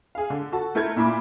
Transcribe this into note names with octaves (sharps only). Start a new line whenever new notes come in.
G#4 F5
D3
F#4 A4 A5
A3 E4 A#4 G6 G#6
A#2 E4 B5 C6 D6